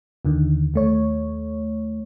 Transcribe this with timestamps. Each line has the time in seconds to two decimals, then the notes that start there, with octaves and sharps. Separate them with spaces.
0.25 D#2 D3 D#3
0.74 D#2 A3 C#5